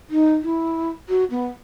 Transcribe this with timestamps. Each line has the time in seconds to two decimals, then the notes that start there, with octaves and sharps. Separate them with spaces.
0.10 D#4
0.43 E4
1.09 F#4
1.31 B3